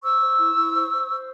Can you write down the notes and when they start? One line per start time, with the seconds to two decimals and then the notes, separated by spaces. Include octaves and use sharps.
0.03 C5 C#6 E6
0.21 C5
0.38 E4
0.56 E4
0.74 C5
0.91 C5
1.09 C5